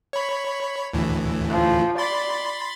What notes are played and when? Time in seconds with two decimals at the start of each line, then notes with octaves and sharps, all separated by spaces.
0.13 C#5 B5
0.93 D2 A2 E3
1.50 F3
1.98 D5 B5 C6 A6